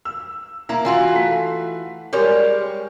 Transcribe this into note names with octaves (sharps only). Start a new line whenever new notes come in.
E6
A#3 E4 A#5
E3 F4 F#4
A3 B6
G3 G#3 G4 A#4 C#5